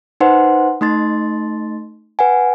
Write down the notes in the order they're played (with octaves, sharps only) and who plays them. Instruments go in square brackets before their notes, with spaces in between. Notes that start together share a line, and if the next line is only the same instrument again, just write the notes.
[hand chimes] D#4 B4 C5 F#5 C6
A3 D#4 C6 A6
B4 F#5 G#5